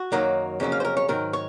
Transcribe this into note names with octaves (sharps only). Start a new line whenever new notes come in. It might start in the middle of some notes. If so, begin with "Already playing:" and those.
Already playing: F#4
F#2 D#3 F#3 A#3 D#4
F2 C#3 F#3 A#3 C#4
F5
C5
A#4
C#5
G#2 D#3 F#3 A#4
C#5